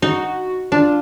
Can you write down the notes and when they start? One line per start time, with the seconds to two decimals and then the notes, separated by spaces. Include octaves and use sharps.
0.02 D#4 F#4
0.72 D4 F4